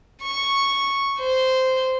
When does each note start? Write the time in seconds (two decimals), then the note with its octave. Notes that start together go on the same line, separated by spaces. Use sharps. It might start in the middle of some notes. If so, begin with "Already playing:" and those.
0.23 C#6
1.19 C5